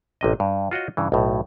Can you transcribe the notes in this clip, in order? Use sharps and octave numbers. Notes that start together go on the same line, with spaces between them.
A1 C3 D#5
G2
F4 F#4 C#5 D#5
G2 C#3 E3
B1 A2